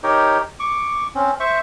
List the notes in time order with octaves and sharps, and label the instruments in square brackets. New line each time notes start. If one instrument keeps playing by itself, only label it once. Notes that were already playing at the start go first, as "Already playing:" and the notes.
[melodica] D#4 G4 A#4 C#5
C#6 D6
C4 C#4
C5 E5 C#6